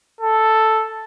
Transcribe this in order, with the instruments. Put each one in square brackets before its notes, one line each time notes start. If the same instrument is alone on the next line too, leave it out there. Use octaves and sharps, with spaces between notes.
[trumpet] A4